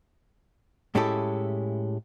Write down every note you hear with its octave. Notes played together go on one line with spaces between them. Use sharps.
A2 G#3 C#4 E4 G4 A4